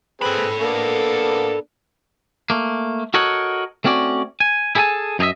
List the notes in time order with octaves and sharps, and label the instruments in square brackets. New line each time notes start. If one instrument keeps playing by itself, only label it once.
[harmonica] C4 G#4 B4 [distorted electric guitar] A4 B5
[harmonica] A#3 B3 D4
[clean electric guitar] A3 A#3
F#4 A4 A#4 C#5 D#5 F#5
A3 C4 C#4 F#4 D5
G#5
E4 G#4 A4 D#5 G#5 A5
F#2 D#4 G#4 D#5 E5